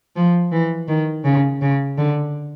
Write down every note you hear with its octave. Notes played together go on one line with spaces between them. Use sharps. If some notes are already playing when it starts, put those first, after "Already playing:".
F3
E3
D#3
C#3
C#3
D3